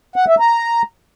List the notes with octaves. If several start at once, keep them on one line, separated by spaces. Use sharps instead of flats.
F#5
E5
A#5